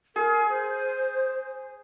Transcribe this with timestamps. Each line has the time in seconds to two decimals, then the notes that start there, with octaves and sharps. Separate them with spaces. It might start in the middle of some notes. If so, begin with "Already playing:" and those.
0.16 G#4 A#4
0.49 C5